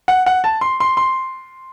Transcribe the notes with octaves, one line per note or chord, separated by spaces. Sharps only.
F#5
F#5
A5
C6
C6
C6